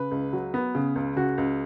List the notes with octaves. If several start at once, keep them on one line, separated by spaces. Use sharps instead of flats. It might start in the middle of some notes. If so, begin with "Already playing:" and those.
Already playing: C#3 B4
C#2
F#3
B3
C#3
C#2
C#3 F#4
C#2